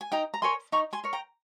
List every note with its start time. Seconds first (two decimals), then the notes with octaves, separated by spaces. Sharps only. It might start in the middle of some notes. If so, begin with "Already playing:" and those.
0.01 G#5
0.12 D#4 G5 A#5
0.34 A#5
0.42 A#4 C#5 G#5 C6
0.72 D#4 A#5 C#6
0.93 G#5 C6
1.04 A#4 C#5
1.13 G5 A#5